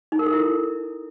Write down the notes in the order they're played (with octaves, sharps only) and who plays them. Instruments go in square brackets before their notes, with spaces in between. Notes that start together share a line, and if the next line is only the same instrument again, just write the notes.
[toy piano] D#4
A#4
A4
E4